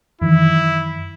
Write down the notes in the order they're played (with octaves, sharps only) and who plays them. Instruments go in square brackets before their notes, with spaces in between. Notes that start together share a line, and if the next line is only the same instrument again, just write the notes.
[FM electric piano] F#2 D#3 E3 [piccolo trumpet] E4